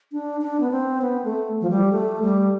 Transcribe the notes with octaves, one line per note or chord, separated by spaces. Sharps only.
D4
D4
B3
C4
B3
A3
F3
G3
A3
G3